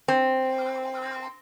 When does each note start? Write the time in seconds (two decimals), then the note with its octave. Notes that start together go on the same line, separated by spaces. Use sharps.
0.08 C4